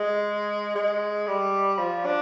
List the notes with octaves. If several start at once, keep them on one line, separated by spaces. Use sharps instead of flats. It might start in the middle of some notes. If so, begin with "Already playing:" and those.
Already playing: G#3
G#3
G3
F3
D4